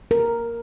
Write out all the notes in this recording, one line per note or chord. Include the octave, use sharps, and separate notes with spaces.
A#4